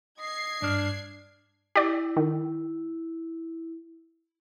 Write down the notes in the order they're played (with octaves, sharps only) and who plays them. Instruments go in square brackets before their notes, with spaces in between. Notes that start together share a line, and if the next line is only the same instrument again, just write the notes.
[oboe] D#5 [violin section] G#6 C7
[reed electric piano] G2 F6 [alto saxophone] D4
[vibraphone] E4 [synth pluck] G4 D5
[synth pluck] D#3